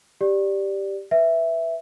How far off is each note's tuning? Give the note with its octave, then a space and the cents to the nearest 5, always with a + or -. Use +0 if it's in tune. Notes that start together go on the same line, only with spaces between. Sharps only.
G4 +0 D5 +0
B4 +0 E5 +0